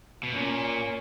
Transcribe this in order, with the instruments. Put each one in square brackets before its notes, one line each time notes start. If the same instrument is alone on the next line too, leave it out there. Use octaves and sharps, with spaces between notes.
[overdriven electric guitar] B2
[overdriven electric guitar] A#2 [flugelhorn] C#4